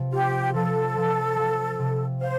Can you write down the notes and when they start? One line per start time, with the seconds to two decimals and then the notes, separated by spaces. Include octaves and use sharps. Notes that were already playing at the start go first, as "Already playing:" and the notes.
Already playing: C3 F3
0.12 F4 G4
0.54 F3 A4
0.96 F3
1.37 F3
1.79 C3
2.21 C5 F5